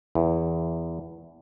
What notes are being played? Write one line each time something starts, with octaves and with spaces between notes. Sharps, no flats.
E2